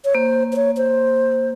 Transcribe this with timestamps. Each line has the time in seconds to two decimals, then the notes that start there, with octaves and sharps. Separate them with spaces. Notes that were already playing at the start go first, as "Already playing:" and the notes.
0.05 C#5
0.14 A#3 C5
0.53 C5
0.56 C#5
0.77 C5